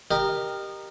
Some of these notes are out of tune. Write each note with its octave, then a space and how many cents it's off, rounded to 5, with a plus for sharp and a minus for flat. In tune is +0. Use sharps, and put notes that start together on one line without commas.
G4 +0 A#4 +0 D#5 -25